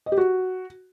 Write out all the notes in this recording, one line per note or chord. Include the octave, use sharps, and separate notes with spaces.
D#5
G4
F#4